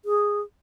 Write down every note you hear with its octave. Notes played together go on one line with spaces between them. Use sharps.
G#4